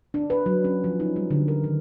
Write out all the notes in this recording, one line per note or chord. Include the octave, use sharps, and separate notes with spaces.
D4
B4
F#3
C#4
F3
D#4
G3
D3
A#4
D#3